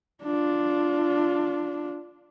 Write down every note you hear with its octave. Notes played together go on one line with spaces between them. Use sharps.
D4 F4